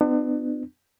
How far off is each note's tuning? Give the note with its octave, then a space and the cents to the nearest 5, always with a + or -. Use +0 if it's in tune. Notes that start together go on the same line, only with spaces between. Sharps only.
B3 +35 D4 +40 F4 +0